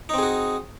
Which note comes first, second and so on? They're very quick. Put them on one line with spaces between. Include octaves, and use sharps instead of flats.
D#4 C4 G#4 F#4